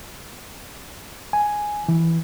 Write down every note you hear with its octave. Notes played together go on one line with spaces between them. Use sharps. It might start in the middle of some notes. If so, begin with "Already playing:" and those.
G#5
E3